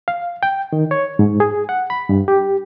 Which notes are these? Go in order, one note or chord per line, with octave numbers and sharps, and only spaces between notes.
F5
G5
D#3
C#5
G#2
G#4
F#5
B5
G2
G4